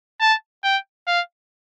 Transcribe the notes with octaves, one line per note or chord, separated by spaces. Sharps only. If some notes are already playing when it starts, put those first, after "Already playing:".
A5
G5
F5